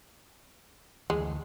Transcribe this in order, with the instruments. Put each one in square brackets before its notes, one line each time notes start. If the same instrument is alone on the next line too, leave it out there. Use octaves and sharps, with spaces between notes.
[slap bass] D2 E3 [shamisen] G#3